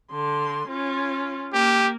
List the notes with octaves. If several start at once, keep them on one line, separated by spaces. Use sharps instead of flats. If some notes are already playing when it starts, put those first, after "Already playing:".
D3 C6
C#4 F4
A#3 G4